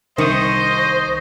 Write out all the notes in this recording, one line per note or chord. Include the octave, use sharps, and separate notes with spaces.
C2 D#3 C5 D#5 C#6 D#6